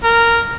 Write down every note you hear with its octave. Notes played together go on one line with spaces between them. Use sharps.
A#4